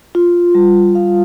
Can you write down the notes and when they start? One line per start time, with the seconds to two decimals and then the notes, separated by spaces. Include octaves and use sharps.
0.15 F4
0.55 G3
0.95 F5